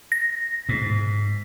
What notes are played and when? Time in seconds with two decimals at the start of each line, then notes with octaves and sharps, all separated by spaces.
0.12 A#6
0.69 G#2